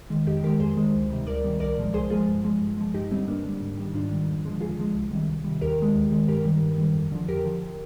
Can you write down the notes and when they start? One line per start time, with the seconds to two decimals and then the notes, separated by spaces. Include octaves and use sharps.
0.10 D#3 G#3
0.27 F2 D#4 G4
0.43 D#3 G#3 G4 A#4
0.60 F2 G#4 C5
0.77 D#3 G#3
0.93 D2
1.10 C3 D#3 G3
1.27 D2 A#4 D5
1.44 C3 D#3 G3
1.60 C2 A#4 D5
1.77 A#2 F3 G#3
1.94 C2 G#4 C5
2.10 A#2 F3 G#3 F4 G#4
2.27 G2
2.44 F3 G#3
2.61 G2
2.77 F3 G#3
2.94 G2 D#4 G4
3.11 D3 G3 C4 D#4
3.28 G2 A#3 D4
3.44 D3 G3
3.61 G#2
3.77 D#3 G3
3.94 G#2 D4 F4
4.11 D#3 G3
4.28 F2
4.45 D3 F3 G#3
4.61 F2 F4 G#4
4.78 D3 F3 G#3
4.95 C2
5.11 C3 D#3 G3
5.29 C2
5.44 C3 D#3 G3
5.61 D#2 G4 A#4
5.78 D#3 G#3
5.95 D#2
6.12 D#3 G#3
6.28 G2 G4 A#4
6.45 D#3 G3
6.62 G2
6.78 D#3 G3
6.95 F2
7.12 D3 F3
7.28 F2 G4 A#4
7.45 D3 F3